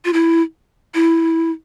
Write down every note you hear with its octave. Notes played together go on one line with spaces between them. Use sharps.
F4
E4
E4